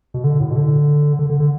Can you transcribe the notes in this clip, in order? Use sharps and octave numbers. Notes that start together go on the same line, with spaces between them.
B2
D3
A2
B2
D3
D3
D3
D3